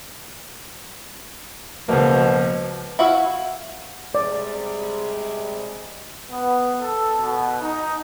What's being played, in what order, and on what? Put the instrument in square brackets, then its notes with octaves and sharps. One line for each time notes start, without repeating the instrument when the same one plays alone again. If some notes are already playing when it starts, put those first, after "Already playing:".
[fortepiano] C#2 A#3 [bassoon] B2 [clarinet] F3
[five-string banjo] E4 F#4 E5 F5
[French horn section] C3 G3 G#3 [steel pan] D5
[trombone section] B3
A4
B2
D#4